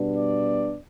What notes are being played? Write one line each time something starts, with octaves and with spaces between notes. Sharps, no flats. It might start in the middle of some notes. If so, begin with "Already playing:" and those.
Already playing: B2 G3 B3 D4
D5